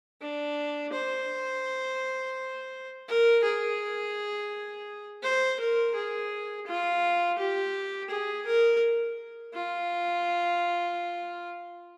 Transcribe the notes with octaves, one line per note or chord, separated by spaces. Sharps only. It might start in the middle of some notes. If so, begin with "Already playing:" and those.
D4
C5
A#4
G#4
C5
A#4
G#4
F4
G4
G#4
A#4
F4